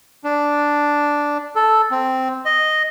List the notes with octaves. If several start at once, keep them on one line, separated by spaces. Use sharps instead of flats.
D4
A4
C4
D#5